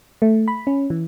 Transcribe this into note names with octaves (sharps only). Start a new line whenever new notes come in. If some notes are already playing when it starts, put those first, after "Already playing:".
A3
B5
C#4
E3